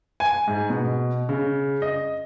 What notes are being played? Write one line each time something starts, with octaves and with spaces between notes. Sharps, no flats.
G#5
G#2
B2
C#3
D#5